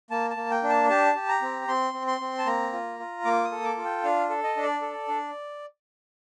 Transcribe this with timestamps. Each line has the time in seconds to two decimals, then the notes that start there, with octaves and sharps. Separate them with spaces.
0.11 A#3 A5
0.30 A5
0.37 A#3
0.51 G5
0.63 D4
0.69 A5
0.89 G4 A5
1.15 G4
1.28 A#5
1.42 C4
1.68 C4 C6
1.94 C4
2.07 C6
2.20 C4
2.38 A5
2.46 A#3 A#5
2.73 F4
3.00 F4
3.25 A#3 D6
3.44 D#6
3.51 A4
3.64 D6
3.77 F4
3.85 G5
4.04 D4 F5
4.30 A4
4.43 D#5
4.57 D4
4.63 D5
4.82 A4
5.08 D4